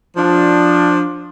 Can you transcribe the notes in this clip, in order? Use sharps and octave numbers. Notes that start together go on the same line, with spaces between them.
F3 D4